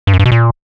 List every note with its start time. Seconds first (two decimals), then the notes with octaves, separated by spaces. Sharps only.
0.07 G2
0.13 F#2
0.19 G2
0.26 B2
0.32 A#2